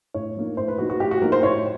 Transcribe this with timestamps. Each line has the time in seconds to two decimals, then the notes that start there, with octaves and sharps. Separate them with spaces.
0.14 A2 C#5
0.37 F3 A#3 D#4
0.57 A2 C5
0.68 B4
0.78 F3 A#3 D#4 F#4
0.90 F#4
1.00 A2 G4
1.11 F#4
1.22 F3 A#3 D#4 A#4
1.32 C5
1.43 A2 C#5